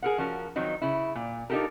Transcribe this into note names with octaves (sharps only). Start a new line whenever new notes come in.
G#4 A#4 F#5
F3 C#4 F#4 A#4
D#3 F3 F#3 C4 D#4
C#3 E4
A#2
D4 D#4 F4 G4 A4 A#4